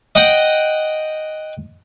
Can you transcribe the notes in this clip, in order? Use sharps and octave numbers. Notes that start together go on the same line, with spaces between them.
D#5 F#5 G5